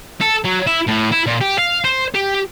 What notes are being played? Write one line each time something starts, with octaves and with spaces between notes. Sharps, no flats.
A4
F#3
E4
A2
E4
A#2
G4
F5
C5
G4